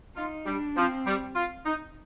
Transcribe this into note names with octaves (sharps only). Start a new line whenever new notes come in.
D#4 F4
G3 D4
F3 C4
G3
F4
D#4